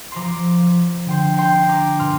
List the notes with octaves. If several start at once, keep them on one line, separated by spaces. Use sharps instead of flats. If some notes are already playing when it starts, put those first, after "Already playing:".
F3 A#5 C6 D6
F3
D3 G5 C6
G5 A#5 C6
D4
A#5 D6
A#2 C6 F6